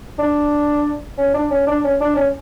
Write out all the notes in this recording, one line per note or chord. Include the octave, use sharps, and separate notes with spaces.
D4
C#4
D4
C#4
D4
C#4
D4
C#4